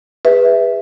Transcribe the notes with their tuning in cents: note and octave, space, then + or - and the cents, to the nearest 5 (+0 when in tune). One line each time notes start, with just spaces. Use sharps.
G#4 -40 B4 +0 E5 +0